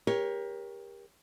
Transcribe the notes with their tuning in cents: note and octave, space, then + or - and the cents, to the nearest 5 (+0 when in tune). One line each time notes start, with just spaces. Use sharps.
G4 +25 A#4 +20 C#5 +0